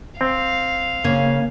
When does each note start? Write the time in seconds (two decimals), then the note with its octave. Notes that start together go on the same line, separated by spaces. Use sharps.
0.21 C4 F5
1.04 C#3 A#3 G#6